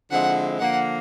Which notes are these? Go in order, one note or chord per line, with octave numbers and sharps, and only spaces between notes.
D3 F3 G#3 C4 E4 F#5
D3 F3 A#3 F#5